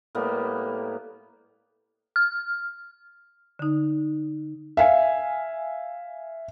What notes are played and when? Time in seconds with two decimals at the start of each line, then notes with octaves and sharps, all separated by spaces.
0.15 A2 G3 A#3 B3
2.16 F6
3.59 D3 D#4
4.77 E5 F5 G#5